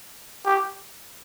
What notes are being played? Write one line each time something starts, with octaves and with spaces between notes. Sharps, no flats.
G4